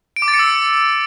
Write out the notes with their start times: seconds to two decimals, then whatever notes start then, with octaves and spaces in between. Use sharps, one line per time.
0.16 D7
0.22 D6
0.28 A6
0.34 C#7
0.39 E6